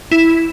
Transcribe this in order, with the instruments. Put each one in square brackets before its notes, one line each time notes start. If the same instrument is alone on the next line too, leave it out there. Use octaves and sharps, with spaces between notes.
[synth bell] E4